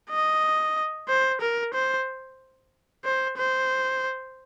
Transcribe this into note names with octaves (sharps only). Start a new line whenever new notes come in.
D#5
C5
A#4
C5
C5
C5